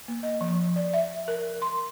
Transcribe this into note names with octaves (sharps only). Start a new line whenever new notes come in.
A#3
D#5
F3
D5
E5
A#4
C6